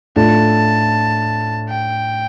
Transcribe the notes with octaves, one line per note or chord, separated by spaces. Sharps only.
A2 A3 D4 F4 A5
G5